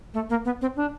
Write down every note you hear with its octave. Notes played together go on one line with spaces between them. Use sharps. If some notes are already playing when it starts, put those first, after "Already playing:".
A3
A#3
B3
C4
D4